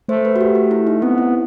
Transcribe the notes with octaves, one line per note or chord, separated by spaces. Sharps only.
A3 C5
B4
F#4
G4
G4
E4
D#4
B3 C4
E4